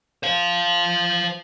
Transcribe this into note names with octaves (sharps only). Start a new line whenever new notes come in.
C5 F5